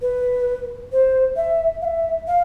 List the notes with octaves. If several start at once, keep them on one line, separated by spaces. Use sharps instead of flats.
B4
C5
E5
F5
E5
F5